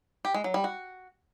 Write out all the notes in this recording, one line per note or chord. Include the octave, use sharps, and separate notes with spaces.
G4
G#3
F#3
G3
F#4